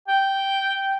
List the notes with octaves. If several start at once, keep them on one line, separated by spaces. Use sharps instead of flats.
G5